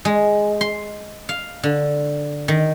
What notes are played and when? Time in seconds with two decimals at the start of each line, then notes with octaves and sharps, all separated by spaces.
0.05 G#3
0.61 C6
1.29 F5
1.63 D3
2.48 D#3